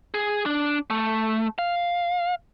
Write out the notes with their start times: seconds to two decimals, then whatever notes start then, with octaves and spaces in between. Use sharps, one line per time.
0.14 G#4
0.46 D4
0.90 A3
1.59 F5